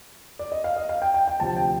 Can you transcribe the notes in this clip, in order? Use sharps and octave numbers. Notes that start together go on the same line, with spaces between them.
D5
D#5
F5
D#5
F5
G5
G5
G5
D2 C3 F3 A5
G5